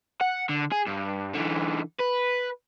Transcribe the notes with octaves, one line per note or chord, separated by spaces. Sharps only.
F#5
D3
G#4
G2
D3 E3
B4